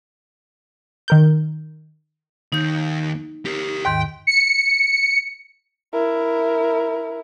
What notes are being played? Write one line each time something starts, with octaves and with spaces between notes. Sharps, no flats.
D#3 A#4 G6
D#2 D#4 G6
G4 A#4
D#2 G#2 D#3 G5
C#7
E4 A#4